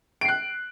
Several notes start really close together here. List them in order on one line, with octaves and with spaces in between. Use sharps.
D7 C7 F#6